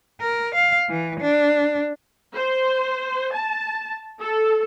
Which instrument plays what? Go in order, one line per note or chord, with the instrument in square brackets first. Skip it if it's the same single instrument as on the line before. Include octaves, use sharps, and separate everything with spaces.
[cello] A#4
F5
E3
D4
[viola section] C5
A5
A4